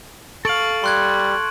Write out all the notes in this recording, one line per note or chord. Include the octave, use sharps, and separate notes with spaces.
A4 F5 C#6 D7 F#7
G3 C6 F#6 G#6